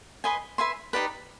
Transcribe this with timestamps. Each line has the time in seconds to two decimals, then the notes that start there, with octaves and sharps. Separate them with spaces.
0.24 B4 D#5 G#5 C6
0.58 B4 E5 G#5 C6
0.93 D#4 G4 B4 D5